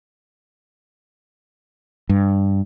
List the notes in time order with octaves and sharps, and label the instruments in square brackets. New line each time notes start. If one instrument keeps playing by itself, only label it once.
[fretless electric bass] G2